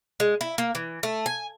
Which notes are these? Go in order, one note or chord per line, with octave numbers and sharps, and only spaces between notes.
G#3
E4
A#3
E3
A3
G#5